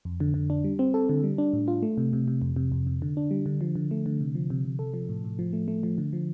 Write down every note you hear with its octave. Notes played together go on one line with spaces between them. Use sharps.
F2
D3
D3
D4
G3
C4
A4
D3
G3
D4
A2
F4
A3
C3
C3
C3
F2
C3
F2
C3
D3
D4
G3
D3
F3
D3
A3
D3
C3
F3
C3
C3
A4
F3
A2
A2
F3
A3
A3
F3
D3
F3